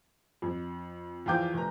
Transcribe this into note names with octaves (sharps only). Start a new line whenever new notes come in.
F2
E2 F3 F4 G5 D6 G6
F1 A#5